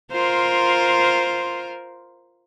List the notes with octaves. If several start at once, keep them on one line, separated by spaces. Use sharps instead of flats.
F4 A#4 C5